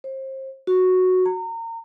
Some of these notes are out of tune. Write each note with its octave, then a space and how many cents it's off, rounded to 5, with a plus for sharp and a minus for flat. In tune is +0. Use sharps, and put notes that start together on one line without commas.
C5 +30
F#4 -5
A#5 -30